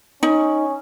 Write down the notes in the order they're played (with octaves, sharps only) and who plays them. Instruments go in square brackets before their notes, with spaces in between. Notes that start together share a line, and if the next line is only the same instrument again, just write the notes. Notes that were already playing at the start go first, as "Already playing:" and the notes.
[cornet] C#4 [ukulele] D#4